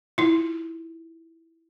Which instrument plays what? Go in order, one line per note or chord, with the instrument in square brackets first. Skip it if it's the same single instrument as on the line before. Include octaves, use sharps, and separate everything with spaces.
[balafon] E4 F4